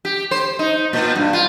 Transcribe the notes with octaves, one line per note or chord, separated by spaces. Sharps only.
G4
C5
D#4
A#2
G2
F4